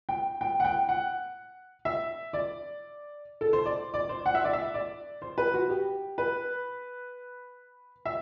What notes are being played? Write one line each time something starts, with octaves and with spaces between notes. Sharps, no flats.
G5
G5
F#5
G5
F#5
E5
D5
A4
C5
D5
D5
C5
F#5
E5
D5
E5
D5
C5
B4
F#4
G4
B4
E5